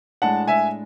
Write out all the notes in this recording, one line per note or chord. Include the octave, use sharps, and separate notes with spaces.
A2 G#3 D4 F#5 A5
E5 G#5